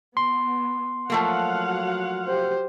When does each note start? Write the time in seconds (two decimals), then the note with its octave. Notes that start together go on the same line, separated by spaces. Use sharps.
0.17 B3 C6
1.10 F3 F#3 A3 A#3 F5 F#5
2.27 G4 C5